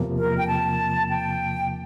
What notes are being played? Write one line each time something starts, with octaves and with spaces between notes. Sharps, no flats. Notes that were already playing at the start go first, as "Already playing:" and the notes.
Already playing: E2 C3 F3 A#3
A#4
G5
A5
G5